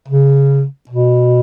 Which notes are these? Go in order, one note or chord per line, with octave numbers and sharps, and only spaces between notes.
C#3
B2